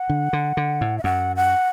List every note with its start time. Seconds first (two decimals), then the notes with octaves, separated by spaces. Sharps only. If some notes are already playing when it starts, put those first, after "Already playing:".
Already playing: F#5
0.09 D3
0.33 D3
0.57 D3
0.81 A2
0.98 E5
1.04 F#2 F#5
1.36 F#5